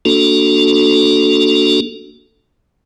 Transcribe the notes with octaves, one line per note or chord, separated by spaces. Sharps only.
A#3 D4 F#4 A4